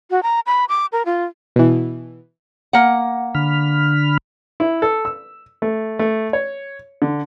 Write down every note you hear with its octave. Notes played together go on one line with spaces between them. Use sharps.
F#4
A#5
B5
D6
A#4
F4
B2 E3
A#3 F#5
D3 B5 F6
E4
A4
E6
A3
A3
C#5
D3